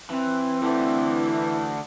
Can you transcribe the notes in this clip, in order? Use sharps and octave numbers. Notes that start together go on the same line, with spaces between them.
E3 C4
D3 E3 A3